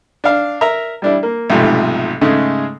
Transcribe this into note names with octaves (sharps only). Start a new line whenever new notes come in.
D4 F5
A#4 E5 A#5
G3 D4 E4
A#3
B1 G#2 C3 F3 A3
G#2 C#3 G#3 A3